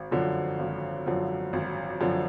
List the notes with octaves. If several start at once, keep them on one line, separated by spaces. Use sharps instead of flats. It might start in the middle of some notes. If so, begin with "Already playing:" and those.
Already playing: G#1
F#2 D3 F3
G#1
F#2 D3 F3
G#1
F#2 D3 F3